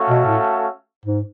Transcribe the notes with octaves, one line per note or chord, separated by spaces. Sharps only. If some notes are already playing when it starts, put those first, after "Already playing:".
Already playing: A3 C#4 F#4 A4 F5
B2
A2
G#2